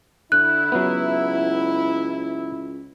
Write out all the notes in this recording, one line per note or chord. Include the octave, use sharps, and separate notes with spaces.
D3 E4 F#6
C#2 F#3 B3